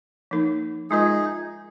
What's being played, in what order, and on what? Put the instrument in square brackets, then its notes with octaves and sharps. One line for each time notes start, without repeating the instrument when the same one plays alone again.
[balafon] F3 A#3 D#4 A#4
[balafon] G#3 F4 A#4 D#5 [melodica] D#4 G#4